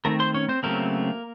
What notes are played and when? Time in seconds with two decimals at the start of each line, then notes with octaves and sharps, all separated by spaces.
0.05 D#3 A3 C4 A#4 A#5
0.20 C5 C6
0.34 C#4 C#5
0.49 C4 C5
0.63 C#3 F#3 A3 A#3 C4 A#4